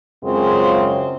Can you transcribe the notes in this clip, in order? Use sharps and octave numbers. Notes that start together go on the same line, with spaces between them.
F#2 C#3 G#3 C4 F4